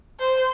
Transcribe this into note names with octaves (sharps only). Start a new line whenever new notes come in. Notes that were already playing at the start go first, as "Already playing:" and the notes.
C5